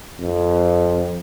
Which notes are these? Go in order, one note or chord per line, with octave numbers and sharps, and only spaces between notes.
F2